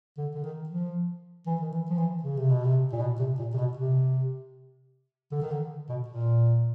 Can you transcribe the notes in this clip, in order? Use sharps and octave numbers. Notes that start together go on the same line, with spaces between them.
D3
D3
D#3
F3
E3
D#3
E3
F3
E3
C#3
C3
B2
C3
A#2
B2
C3
A#2
C3
B2
C3
D3
D#3
D3
B2
A#2